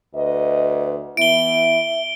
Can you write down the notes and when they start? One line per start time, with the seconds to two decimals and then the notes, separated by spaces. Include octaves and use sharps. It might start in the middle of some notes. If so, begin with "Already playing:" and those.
0.14 D2 B4 D#5
1.17 E3 B3 E4 E5 D7 G7